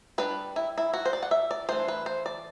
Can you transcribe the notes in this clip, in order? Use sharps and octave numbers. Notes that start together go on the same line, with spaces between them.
G3 D4 B4
E4
E4
F#4
C5
D5
F#5
E5
D5
E3 A3 D4 C5
B4
C5
D5